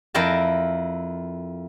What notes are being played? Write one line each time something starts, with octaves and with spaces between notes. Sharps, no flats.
F2 E4 A#4 G5 A5